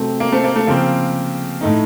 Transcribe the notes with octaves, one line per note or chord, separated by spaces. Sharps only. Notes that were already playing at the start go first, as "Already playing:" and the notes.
Already playing: C3 F#3 A3 C4
A#3
A3 C4
A#3
A3
C#3 F3 A#3 C4
A2 A3 D#4